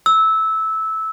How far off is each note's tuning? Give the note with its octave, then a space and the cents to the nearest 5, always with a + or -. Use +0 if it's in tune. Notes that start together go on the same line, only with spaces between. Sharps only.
E6 -15